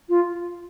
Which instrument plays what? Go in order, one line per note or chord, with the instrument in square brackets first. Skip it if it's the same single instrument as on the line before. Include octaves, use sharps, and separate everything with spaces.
[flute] F4